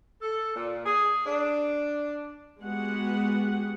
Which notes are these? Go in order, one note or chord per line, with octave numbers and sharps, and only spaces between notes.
A4
A#2
G#4
D4
G#3 B3 F#4 G4 F#5